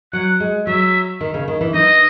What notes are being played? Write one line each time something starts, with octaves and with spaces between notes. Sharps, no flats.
F#3 F#5
G#3
F#3 E5
D#3
C#3
D#3
E3
D#4 D#5